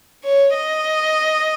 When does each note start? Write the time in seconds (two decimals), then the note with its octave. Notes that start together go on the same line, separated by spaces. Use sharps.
0.24 C#5
0.54 D#5